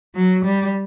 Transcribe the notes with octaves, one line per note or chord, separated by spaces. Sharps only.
F#3
G3